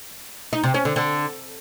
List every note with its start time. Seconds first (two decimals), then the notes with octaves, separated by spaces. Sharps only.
0.53 D#4
0.64 C3
0.74 C#4
0.85 D3
0.96 D3